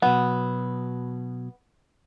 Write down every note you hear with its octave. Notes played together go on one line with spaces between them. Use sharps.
B2 F#3 B3